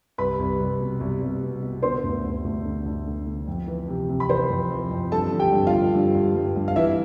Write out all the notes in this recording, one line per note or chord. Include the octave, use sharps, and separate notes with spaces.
C2 B4 B5
C2
C2
B2
C2
C2
B2
B2
D3 C5 C6
D2
D2
D2
D3
D2
D3
D3
F2
E3
C3
C3
B5
E3 C5 C6
F2
E3
F2
G2 A4 A5
D3
G4 G5
G2
F4 F5
D3
G2
G2
G2
G2
F5
E3 E4 E5